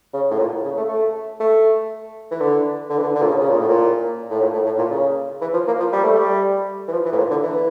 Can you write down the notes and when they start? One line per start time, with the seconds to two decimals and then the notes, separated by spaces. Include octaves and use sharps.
0.14 C#3
0.31 A2
0.39 A#2
0.64 C#3
0.77 A3
0.89 A3
1.40 A3
2.31 E3
2.41 D3
2.90 D3
2.98 E3
3.03 D3
3.15 D3
3.22 A#2
3.28 C#3
3.40 C#3
3.50 A#2
3.59 A2
3.68 A#2
4.30 A2
4.41 A#2
4.53 A2
4.66 A2
4.78 A#2
4.91 C#3
5.41 E3
5.54 F3
5.67 A#3
5.79 F3
5.92 G3
6.04 A3
6.17 G3
6.88 E3
6.93 F3
7.06 E3
7.12 A2
7.17 A#2
7.30 D3
7.42 E3